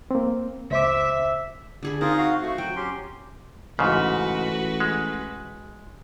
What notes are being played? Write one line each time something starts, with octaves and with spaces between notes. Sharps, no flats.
A#3 C4
C#2 C5 E5 D6
D3 G#4 B5
C4 D#4 F4 G#4 A#4
F#4 F5
A3 F#4
F#3 G5
C#4 G4 C6
A1 G#2 C#3 F#4 B4
G#3